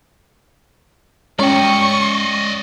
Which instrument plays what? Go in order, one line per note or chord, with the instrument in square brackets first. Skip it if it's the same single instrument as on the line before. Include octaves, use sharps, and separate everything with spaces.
[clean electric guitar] G#3 G5 [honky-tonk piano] C#4 [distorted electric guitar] D5 D#5 [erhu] C#6